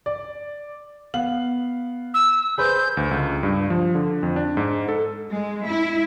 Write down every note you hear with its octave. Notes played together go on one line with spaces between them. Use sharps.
D5
B3 F5 F#7
E6
G#4 B4 C5 G6
D2
C#2
G2
F3
D3
F2
D4
G#2
A4
G#3
E4